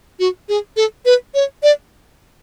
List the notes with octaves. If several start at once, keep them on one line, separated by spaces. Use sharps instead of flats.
F#4
G#4
A4
B4
C#5
D5